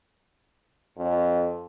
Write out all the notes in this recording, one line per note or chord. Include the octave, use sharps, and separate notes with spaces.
F2